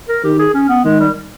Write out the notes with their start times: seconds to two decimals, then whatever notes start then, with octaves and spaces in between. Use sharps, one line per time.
0.09 A#4
0.24 D#3 G4
0.39 G#4
0.54 C#4
0.69 B3
0.85 D#3 G#3
1.00 G3